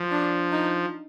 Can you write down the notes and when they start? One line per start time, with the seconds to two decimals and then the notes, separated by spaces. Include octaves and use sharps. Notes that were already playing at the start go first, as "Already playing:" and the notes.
Already playing: F3
0.11 D4
0.52 D#4